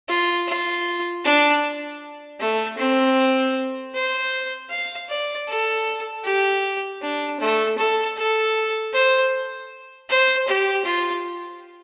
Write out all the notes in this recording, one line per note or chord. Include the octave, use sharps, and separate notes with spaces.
F4
F4
D4
A3
C4
C5
F5
D5
A4
G4
D4
A3
A4
A4
C5
C5
G4
F4